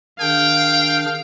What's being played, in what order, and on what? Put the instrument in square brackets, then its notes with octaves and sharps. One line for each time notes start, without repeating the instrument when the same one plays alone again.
[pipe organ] D#3 D4 G#4 [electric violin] F5 [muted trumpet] G5